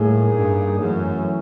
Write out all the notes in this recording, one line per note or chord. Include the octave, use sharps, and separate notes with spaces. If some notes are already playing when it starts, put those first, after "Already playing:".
Already playing: A2 G3 A#3 D#4 G#4
G2
F#2 E3 A3 C#4